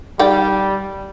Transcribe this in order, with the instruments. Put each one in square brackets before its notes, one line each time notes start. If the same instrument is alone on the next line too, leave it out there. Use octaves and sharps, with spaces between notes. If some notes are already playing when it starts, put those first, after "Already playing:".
[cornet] G3 [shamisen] D#4 D5 G5